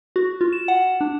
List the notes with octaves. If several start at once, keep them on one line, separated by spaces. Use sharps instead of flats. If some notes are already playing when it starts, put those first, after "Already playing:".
F#4
F4
E7
F#5
D4